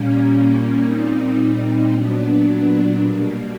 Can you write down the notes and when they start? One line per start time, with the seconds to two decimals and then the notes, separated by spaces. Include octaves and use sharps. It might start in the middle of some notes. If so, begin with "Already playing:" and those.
Already playing: A#2 G3 A#3 C#4
0.81 A#2 G3 C4 D#4
1.92 A#2 F#3 B3 D4
3.03 B2 G3 A#3